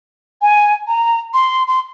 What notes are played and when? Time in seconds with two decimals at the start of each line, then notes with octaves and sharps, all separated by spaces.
0.42 G#5
0.87 A#5
1.34 C6
1.67 C6